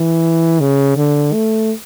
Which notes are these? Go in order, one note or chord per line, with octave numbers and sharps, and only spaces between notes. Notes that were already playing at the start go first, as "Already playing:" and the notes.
Already playing: E3
C#3
D3
A3